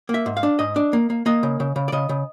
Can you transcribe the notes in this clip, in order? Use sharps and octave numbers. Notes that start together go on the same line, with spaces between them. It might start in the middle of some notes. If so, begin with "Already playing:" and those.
A#3
E5
G#2
F5
D4
G#2 D#5
D4
A#3
A#3
A#3 D#5
C#3
C#3
C#3
D5
C#3 D#5
C#3